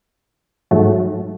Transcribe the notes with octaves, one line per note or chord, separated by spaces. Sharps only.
G#2 F#3 A3